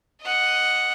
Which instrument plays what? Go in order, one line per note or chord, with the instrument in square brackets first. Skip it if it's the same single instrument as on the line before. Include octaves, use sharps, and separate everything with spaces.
[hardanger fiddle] D#5 F#5